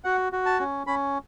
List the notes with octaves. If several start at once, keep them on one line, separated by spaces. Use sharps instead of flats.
F#4 F#5
F#4
A5
C#4
C#4 B5